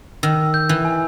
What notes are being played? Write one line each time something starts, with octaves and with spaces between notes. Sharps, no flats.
D#3 E6
G6
E3
G#5